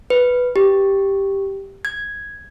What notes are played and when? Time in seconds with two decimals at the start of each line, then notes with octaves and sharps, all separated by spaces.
0.10 B4
0.56 G4
1.85 G#6